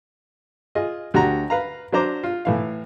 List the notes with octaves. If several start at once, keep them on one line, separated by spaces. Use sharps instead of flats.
F4 G#4 D#5
D2 F#4 G4 A#5
B4 F5 A#5
F#3 D4 C5 A#5 D6
F4
A2 E3 F5